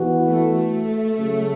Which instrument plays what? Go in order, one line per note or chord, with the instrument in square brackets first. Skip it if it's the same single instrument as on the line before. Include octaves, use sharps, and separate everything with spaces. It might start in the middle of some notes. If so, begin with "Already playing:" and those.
Already playing: [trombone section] E3 B3 F#4
[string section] A3
[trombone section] C#3 F#3 C#4 F#4